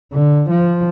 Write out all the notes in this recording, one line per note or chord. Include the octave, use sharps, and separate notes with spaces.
D3
F3